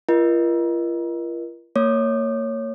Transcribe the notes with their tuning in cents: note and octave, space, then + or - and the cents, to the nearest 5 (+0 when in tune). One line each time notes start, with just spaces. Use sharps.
F4 -40 A#4 +35 D#5 +0
A#3 -30 C#5 +0 D6 +45